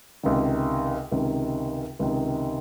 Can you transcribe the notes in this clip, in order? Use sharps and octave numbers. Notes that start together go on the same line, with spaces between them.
C#2 C3 D#3
C#2 C3 D#3
C#2 C3 D#3